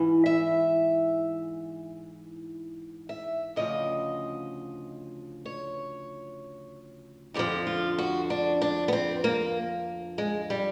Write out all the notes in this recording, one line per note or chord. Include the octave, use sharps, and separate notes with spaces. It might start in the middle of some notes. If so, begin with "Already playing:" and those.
Already playing: G#2 E3
E5
E5
D2 C#3 F3 D#5
C#5
F2 D3 F3 G4
F4
F#4
D4
D4
B3
C4
A#3
G#3
G3